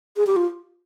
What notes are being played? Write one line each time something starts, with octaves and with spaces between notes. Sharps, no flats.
G#4
G4
F4